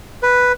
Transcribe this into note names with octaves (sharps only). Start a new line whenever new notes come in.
B4